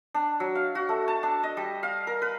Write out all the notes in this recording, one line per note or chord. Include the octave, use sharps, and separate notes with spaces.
D4
F#3
F5
F#4
A3
A5
D4
D#5
G3
F5
A#4
B4